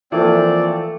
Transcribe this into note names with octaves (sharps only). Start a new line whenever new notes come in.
E3 F3 A3 A#3 C4 D5